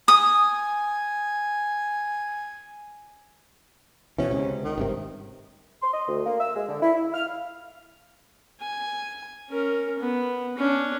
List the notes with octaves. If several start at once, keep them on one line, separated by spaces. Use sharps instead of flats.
G#5 D#6
B2 E3 C#4
C#2 C3
D#3
G#1 G2 C3
C6
D#5
D2
A#3
E6
G#3
D3
E4
E4
F6
F5
G#5
C#4 A#4
B3
C#4 D4